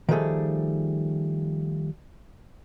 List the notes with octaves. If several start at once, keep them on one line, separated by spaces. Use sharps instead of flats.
D#3 F3 G3 A3 G#4 A4